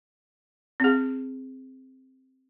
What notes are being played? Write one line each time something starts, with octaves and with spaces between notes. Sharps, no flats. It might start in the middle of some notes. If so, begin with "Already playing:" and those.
C4 G#4